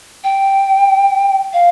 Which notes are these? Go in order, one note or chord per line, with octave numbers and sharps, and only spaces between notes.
G5
F5